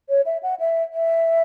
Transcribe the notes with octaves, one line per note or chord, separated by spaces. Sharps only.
C#5
E5
F#5
E5
E5